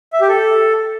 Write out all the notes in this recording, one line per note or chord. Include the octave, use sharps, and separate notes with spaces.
E5
G4
A4